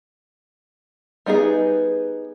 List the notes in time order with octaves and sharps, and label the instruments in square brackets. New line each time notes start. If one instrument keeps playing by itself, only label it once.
[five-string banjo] G3 B3 D#4 F4 G#4